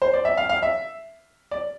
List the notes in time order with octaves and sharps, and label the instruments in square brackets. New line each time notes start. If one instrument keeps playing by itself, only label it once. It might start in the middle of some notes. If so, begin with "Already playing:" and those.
[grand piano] C5
D5
E5
F5
F5
E5
D5